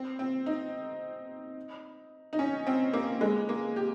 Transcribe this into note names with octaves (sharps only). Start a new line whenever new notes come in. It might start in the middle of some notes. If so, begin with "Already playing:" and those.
Already playing: C4
C4
D#4
D#4
C#4
C4
A#3
G#3
A#3
G4